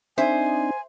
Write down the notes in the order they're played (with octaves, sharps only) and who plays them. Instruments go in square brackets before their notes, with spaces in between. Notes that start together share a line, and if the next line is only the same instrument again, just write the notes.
[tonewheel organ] C4 D4 D#4 [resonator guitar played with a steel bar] C5 [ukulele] E5 [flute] G#5